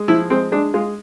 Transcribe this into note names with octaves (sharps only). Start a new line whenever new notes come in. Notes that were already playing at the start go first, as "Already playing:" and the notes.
Already playing: G#3
F3 E4
G#3 C4
G#3 D4
G#3 F4